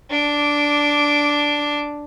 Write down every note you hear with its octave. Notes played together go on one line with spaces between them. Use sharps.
D4 D6